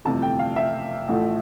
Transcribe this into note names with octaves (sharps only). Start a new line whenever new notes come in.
G1 F2 C3 E3 A3 A5
G5
F5
E5
A1 A2 F3 A3